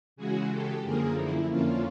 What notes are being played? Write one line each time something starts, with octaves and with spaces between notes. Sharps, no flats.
C#3 E3 G#3 F#4 G#4
G4 A4
F#2 D3 F3 A#3 G#4 A#4
E4
F2 D3 F3 A#3 C#4 F4